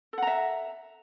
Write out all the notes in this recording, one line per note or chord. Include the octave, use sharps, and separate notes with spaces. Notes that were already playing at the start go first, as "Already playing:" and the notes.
A4 E5 F#5 A#5